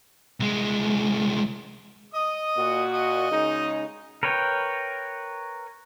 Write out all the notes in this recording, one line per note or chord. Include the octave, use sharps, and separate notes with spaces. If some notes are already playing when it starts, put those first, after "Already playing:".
C2 G#3
D#5 D#6
A#2 F#4
D#5
C#3 G#3 D#4
A#4 B4 C#5 G5